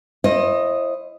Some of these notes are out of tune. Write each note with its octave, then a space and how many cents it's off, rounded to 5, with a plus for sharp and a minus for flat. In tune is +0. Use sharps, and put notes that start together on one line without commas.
E4 +25 C5 +40 D#5 +0